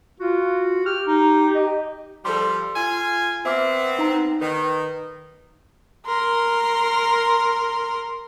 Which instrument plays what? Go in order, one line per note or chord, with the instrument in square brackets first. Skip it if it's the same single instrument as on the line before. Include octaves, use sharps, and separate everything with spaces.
[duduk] F4 [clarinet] F#4
[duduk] G4 [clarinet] F6
[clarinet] D#4
D#5
[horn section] F3 G3 [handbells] A4 C6
[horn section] F4 G#5
[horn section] B3 C4 [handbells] E5 D6 F6
[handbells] D#4 A#5
[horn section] D#3 [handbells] B4
[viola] A#4 C6